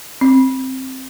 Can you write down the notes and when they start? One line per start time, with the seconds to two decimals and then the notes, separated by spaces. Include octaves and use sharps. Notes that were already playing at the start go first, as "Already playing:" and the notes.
0.21 C4